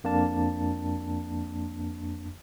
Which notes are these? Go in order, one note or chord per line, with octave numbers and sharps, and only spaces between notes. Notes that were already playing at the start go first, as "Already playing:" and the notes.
F2 A#3 D4 A5